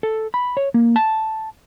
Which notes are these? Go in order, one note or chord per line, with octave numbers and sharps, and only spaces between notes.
A4
B5
C#5
A#3
A5